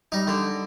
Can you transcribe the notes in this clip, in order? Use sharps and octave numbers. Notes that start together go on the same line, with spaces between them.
G3 D#4
D3